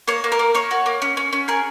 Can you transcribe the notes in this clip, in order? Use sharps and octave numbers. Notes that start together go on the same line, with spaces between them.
A#3 C#5
A#3
A#4
A#3
A#3 C#5
F#4
A#3
C#4
C#4
C#4
G#4 A#4